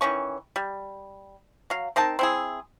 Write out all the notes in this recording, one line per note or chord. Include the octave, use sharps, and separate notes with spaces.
D#3 E3 C#4 C#6
G3
F#3 F5
C4 D#4 A#4 A5
C4 E4 G#4